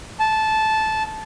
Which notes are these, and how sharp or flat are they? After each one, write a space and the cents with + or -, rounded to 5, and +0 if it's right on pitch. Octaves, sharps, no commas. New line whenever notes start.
A5 -15